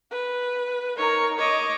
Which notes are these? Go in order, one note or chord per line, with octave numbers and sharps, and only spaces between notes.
B4
D#4 A#4 C#5
C#5 D#5 D6